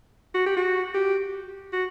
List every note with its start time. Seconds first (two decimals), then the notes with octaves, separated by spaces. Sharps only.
0.34 F#4
0.46 G4
0.57 F#4
0.95 G4
1.73 F#4